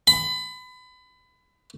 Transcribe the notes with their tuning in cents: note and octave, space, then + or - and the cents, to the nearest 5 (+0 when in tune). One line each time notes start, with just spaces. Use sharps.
B5 +30